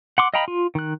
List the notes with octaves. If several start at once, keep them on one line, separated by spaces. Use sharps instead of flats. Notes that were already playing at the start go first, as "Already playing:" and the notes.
F#5 C6 D6
D#5 F5 G5 A#5 B5
F4
D#3 F#6